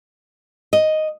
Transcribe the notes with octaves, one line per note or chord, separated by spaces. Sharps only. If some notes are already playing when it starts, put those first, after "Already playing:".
D#5